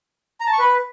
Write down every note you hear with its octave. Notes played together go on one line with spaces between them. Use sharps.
A#5
A5
C#6
B4